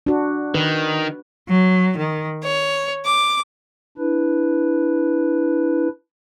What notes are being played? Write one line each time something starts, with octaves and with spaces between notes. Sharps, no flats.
D4 F#4
D#3 B4
F#3
D#3
C#5
D6
D4 E4 B4